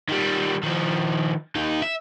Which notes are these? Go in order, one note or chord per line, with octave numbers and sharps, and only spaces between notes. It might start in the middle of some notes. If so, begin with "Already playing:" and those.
D#3 G3
D#3 F3
D#2 D#4
E5